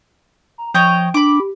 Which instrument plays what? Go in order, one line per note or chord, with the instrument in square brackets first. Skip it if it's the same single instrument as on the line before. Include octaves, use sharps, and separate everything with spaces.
[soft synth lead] A#5
[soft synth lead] F3 [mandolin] C#5 D#5 G5
[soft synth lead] D4 [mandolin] B5 D6
[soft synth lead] G4